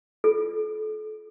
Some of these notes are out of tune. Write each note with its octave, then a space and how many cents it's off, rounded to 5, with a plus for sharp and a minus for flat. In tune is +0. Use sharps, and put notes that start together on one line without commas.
F4 -15 A4 -35